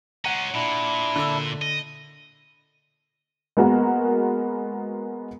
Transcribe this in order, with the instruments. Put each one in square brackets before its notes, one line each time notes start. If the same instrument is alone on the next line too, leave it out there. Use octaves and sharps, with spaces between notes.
[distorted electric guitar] G#3 C#4 [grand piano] F#5 A#5
[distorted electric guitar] A#2 [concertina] D4 E4
[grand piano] D3 E6
[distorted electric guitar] D#5
[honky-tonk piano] G#3 A#3 B3 F#4 A#4